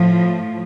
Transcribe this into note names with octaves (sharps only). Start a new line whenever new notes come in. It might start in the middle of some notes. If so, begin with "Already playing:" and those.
Already playing: A2 F3